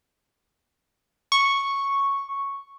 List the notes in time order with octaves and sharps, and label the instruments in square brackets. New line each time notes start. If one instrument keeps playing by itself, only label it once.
[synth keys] C#6